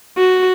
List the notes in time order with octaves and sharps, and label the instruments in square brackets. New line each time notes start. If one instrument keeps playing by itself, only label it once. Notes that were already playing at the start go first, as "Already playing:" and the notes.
[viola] F#4